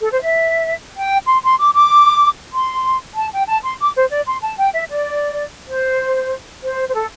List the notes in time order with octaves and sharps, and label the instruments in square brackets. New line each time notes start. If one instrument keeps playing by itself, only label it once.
[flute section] A4
C5
E5
G5
C6
C6
D6
D6
C6
A5
G5
A5
C6
D6
C5
D5
C6
A5
G5
E5
D5
C5
C5
C5
A4